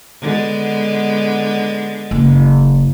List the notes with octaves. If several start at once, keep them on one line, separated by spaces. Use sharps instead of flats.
D3 G#3 B3
F#1